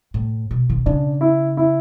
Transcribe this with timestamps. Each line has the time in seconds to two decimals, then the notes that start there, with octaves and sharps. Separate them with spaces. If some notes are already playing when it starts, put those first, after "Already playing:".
0.14 A2
0.51 B2
0.70 E3
0.78 D3
0.86 C#3 D4
1.21 E4
1.57 E4